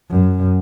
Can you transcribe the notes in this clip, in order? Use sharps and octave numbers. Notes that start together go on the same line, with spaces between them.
F#2